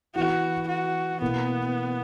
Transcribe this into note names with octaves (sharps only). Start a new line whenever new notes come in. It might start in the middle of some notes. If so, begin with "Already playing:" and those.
E3 B3 E4 F#4
F#4
B2 A#3 B3 E4